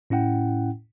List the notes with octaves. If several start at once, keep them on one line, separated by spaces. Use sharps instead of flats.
A2 C#4 E4 F#5 G5